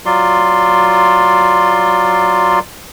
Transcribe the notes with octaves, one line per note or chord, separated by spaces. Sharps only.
F#3 F4 D5 C6